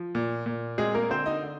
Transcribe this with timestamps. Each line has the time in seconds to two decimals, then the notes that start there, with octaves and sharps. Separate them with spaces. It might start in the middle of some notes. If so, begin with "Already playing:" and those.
Already playing: F3
0.15 A#2
0.46 A#2
0.78 G#3 C4 G#4
0.94 A#3 A#4
1.10 D3 C4 C5
1.26 D#4 D#5
1.42 D3